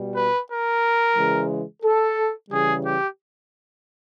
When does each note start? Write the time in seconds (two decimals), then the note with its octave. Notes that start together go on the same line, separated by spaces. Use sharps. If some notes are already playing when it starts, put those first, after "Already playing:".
Already playing: B2 G3
0.15 B4
0.49 A#4
1.15 C#3 E3 G#3
1.83 A4
2.50 C#3 E3 G3 G#4
2.83 G4